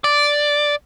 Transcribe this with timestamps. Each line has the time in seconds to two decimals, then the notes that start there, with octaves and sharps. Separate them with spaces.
0.04 D5